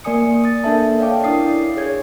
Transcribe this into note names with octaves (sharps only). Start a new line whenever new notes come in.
A#3 A#4 D5 G#5 D#6 C#7
D#6 A6
A#3 D4 A4 A#4 E5 A5
C#5 D5 F5 G5 D6
D4 E4 A#4 D#6 C7
G#4 C#5 G#6